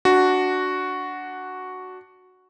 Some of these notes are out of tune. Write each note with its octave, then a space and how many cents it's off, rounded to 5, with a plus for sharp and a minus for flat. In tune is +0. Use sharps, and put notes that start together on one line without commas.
D4 +0 F#4 +0